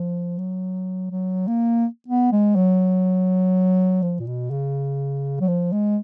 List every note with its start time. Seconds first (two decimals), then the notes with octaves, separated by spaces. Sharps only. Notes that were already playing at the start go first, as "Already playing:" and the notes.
Already playing: F3
0.38 F#3
1.11 F#3
1.47 A#3
2.08 B3
2.32 G#3
2.56 F#3
4.02 F3
4.20 A#2
4.27 B2
4.51 C#3
5.41 F#3
5.48 F3
5.72 G#3